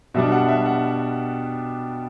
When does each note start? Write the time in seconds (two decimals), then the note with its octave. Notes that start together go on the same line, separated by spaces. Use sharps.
0.14 B2 G3 D4 E5
0.32 F#5
0.49 E5
0.66 F#5